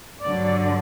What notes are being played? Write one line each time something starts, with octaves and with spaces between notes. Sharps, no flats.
G2 D3 F#3 D5